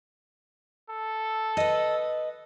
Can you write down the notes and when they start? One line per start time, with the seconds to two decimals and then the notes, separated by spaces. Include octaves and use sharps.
0.90 A4
1.57 B4 D#5